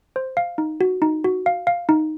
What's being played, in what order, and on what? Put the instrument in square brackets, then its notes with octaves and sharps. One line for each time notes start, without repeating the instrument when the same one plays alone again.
[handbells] C5
F5
D#4
F#4
D#4
F#4
F5
F5
D#4